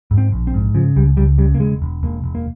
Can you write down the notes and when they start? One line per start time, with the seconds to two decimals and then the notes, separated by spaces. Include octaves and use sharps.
0.11 G#2
0.18 C4
0.32 A#1
0.47 C4
0.54 G#2
0.75 C#3 F3
0.96 C#2 G3
1.17 C#2 G3
1.38 C#3 G3
1.55 A#3
1.60 E1 G#3
1.82 E1
2.03 E1 A#3
2.24 E1
2.35 A#3